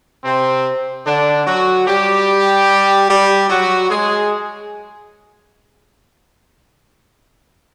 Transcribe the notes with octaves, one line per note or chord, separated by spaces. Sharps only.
C3 C4
D3 D4
F#3 F#4
G3 G4
G3 G4
F#3 F#4
G#3 G#4